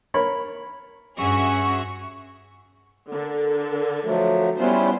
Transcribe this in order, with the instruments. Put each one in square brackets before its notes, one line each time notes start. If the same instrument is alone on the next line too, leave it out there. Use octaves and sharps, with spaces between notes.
[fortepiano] A#4 C#5 B5
[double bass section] G2 [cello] C#4 [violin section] F#4 G#4 E5 [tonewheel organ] C#6
[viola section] D3 A4 A#4
[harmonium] F3 F#3 A3
[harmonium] G3 C#4 E4 [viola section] B3 F4 C5